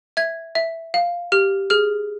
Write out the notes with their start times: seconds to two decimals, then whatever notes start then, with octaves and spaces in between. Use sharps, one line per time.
0.17 E5 G#6
0.55 E5
0.94 F5
1.32 G4 F6
1.70 G#4 F6